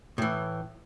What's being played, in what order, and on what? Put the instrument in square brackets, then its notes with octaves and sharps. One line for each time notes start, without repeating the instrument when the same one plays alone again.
[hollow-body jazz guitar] A2 E3